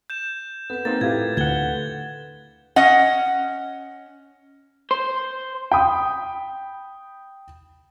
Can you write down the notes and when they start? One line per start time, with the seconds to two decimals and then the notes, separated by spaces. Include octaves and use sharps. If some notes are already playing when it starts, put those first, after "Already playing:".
0.10 G6 E7
0.70 B3 A4 B4
0.85 A#3 C4 D#4 A6
1.01 A2 E4 F4 G4 G#6
1.37 D2 F#5 G#6 G7
2.76 C#4 D#5 F#5
4.91 C5
5.72 G5 B5 D#6